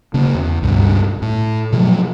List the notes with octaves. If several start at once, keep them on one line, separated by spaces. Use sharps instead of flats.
C#3 A#3
E2
C#2 G2 B2
A2
B2 F3 F#3 A3